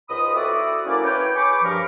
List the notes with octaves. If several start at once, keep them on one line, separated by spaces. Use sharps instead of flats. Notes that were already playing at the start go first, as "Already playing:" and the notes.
C#2 G#2 B5 D#6
C4 E4 F#4 A4 D5
F#3 A#3 C#4 E4 D5
B4 C#5 G5
G#4 B5 C#6 D6
G2 F3 A#4